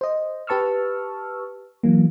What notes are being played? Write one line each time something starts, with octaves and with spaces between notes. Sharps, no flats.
C5 D#5
G4 B4 A5 C#6 E6 F6
E3 F#3 A#3